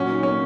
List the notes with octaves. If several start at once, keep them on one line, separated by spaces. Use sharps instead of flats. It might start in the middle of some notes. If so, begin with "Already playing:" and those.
Already playing: A#2 F#3 C#4
D#4
A#3 C#4